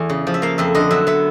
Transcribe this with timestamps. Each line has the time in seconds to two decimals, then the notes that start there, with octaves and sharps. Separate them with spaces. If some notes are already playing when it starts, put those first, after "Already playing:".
Already playing: E2 E3 A3
0.10 C#3
0.27 F3
0.34 E5
0.42 A#3 F5
0.58 F2 E5
0.75 D3 D#5
0.91 F#3 E5
1.07 B3 E5